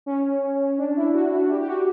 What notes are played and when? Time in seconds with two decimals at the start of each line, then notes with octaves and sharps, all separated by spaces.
0.06 C#4
0.78 D4
0.96 E4
1.14 F#4
1.31 F#4
1.50 G4
1.61 G4
1.67 F#4